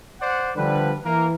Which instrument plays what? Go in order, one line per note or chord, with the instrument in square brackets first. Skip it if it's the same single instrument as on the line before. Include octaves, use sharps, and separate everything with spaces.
[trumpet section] C5 D5 F#5
[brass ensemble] D3 F3 G3 [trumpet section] B4
[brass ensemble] E3 [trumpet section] A#3 A#4